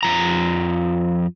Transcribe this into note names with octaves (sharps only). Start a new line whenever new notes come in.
F2 F3 A#5